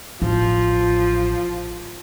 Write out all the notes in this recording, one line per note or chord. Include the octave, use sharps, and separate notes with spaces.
A1 F3